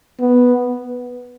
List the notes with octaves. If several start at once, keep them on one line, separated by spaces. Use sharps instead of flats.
B3